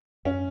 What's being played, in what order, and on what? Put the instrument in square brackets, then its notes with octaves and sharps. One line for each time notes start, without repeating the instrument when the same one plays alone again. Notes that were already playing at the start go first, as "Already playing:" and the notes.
[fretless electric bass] F#2 [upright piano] C#4